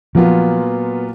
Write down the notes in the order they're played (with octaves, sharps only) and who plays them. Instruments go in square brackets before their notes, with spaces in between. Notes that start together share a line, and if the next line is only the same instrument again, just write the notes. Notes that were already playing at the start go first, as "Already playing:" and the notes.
[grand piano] A#2 F#3 B3 F4 [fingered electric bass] F3